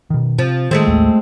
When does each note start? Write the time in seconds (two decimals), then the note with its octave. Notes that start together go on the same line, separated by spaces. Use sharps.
0.10 B2 D#3
0.38 C3 F3
0.71 D#3 G#3 A3 C4
0.86 A1 D#2 A2